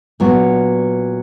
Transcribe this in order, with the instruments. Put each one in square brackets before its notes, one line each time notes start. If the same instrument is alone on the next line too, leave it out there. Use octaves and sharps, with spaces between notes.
[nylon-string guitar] A#2 F#3 B3 D4 F#4